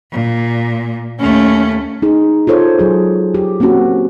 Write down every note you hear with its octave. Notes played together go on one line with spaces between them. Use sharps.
A#2
D#2 A3 C#4
D#4 G#4
F4 A4 C5 C#5
F#3 G#4
G4
A#3 C4 C#4 F#4